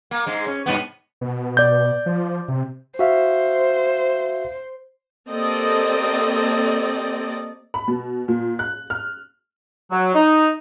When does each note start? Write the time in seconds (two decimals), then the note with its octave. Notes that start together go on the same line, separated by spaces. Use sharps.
0.11 A#3
0.27 G#2 G#3
0.47 C#4
0.66 G2 B2 B3
1.21 B2
1.57 D5 G6
2.06 F3
2.48 C3
2.99 F#4 C5 E5 F5
5.30 A#3 C4 G4 A4 D5 D#5
7.74 B5
7.88 B2
8.28 A#2
8.59 F#6
8.90 F6
9.91 F#3
10.15 D#4